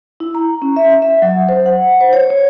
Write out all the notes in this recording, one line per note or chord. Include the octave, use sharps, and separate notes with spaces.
E4
A#5
C#4
E5
E5
F#3
C5
F#5
C5
C#5
C#5